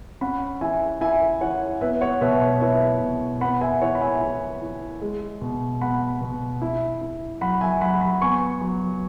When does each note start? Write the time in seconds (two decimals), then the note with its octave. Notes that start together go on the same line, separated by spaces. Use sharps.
0.21 C#4 F#5 B5
0.61 E3 E5 G#5
1.01 E4 E5 G#5
1.41 E3 C#5 F#5
1.81 B3 B4 E5
2.01 C#5 F#5
2.21 B2 B4 E5
2.41 C#5
2.61 E4 B4 E5
3.01 B2
3.41 B3 F#5 B5
3.61 E5 G#5
3.81 E3 C#5 F#5
3.95 B5
4.01 E5 G#5
4.21 E4
4.62 E3
5.01 G#3
5.41 B2
5.81 B3 F#5 B5
6.21 B2
6.62 E4
7.01 E4
7.41 F#3 F#5 B5
7.61 E5 G#5
7.81 F#3 F#5 B5
8.01 F#5 B5
8.21 B3 G#5 C#6
8.61 F#3